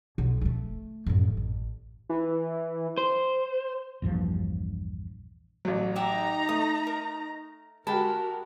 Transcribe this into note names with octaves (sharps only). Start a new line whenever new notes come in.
B1
G#3 A3
A1 F#2
A1
E3
C5
A#1 E2 G2 F3
A1 F#3
D#4 G4 E5 F#5 A#5
A3 D#6
A#4
G#3 F#4 G4 A#4 A5 B5